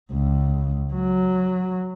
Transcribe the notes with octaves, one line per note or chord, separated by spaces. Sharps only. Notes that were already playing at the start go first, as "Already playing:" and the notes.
C#2
F#3